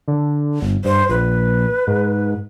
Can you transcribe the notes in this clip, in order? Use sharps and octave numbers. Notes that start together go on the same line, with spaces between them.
D3
G1
G2 C5
A#1 B4
G#2